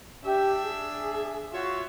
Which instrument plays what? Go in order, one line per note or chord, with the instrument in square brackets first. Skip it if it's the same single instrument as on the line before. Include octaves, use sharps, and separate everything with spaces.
[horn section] D4 E5 [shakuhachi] G4
[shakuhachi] G#4
[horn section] F4 C#5 E5 [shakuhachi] F#4